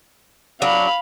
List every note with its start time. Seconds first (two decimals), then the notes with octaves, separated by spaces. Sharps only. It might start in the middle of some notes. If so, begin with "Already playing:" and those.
0.62 F#3 D4 F5 B5